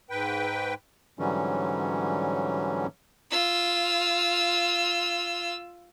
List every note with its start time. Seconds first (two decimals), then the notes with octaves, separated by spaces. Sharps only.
0.10 G#2 B4 G5
1.19 G#2 D3 E3 F#3 G3 C#4
3.31 F4 E6